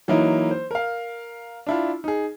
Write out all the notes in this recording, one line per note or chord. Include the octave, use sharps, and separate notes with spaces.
E3 F#3 A#3 D#4 E4
C5
A#4 F5
D4 E4 F4
D#4 G#4